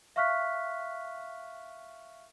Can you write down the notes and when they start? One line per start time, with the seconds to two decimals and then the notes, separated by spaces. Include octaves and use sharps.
0.16 E5 F5 C#6 F6 F#6 B6